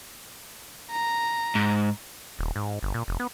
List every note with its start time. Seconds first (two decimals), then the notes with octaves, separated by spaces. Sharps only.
0.91 A#5
1.55 G#2
2.39 D#1
2.56 G#2
2.83 G1
2.94 A#2
3.08 F1
3.20 B3